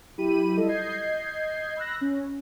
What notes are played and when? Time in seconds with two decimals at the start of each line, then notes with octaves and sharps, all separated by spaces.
0.17 F#3 E4 G4 B5 D#7
0.57 G3 E4 F4 A4 D#5
0.69 D#5 G6 G#6 C7
1.77 B5 E6 F#6 A#6
2.01 C#4